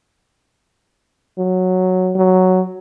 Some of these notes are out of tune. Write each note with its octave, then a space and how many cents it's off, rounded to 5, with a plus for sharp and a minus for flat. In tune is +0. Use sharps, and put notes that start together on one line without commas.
F#3 -5
F#3 +0